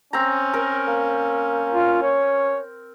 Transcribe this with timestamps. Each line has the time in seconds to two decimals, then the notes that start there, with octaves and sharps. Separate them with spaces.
0.13 C4 C#4 A#5
0.54 A#4
0.88 A#3
1.71 F4
2.02 C#5